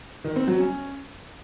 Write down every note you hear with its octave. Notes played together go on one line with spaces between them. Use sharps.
D#3
C4
F#3
C#4